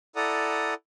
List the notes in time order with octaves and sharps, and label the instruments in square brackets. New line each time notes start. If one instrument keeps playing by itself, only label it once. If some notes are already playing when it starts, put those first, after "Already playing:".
[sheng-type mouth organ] E4 A4 D5 F#5 A#5 D#6